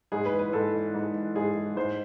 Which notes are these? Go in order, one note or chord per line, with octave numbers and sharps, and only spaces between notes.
G#2 G#4
B4
E3
B4
G#2 A4
E3
G#2
E3
G#2 G#4
E3
G#2 C5